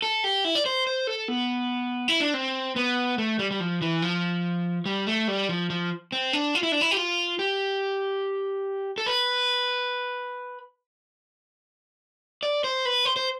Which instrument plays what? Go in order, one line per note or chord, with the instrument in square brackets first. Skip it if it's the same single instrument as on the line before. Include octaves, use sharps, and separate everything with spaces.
[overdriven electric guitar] A4
G4
E4
D5
C5
C5
A4
B3
E4
D4
C4
B3
A3
G3
G3
F3
E3
F3
G3
A3
G3
F3
F3
C4
D4
F4
E4
D4
E4
G4
F4
G4
A4
B4
D5
C5
B4
C5
C5